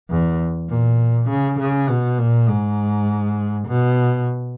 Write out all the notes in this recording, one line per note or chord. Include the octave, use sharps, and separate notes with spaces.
E2
A#2
C#3
C#3
B2
A#2
G#2
B2